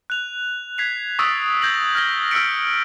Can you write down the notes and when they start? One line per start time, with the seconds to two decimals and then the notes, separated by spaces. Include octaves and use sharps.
0.10 F#6 F7
0.78 G#6 B6 C7 F7
1.19 C#6 D#6 E6 A6 B6 D7
1.62 G6 G#6 A#6 B6 F#7
1.94 D#6 F6 G#6 A#6 G7
2.31 E6 F6 A#6 B6 C#7 D7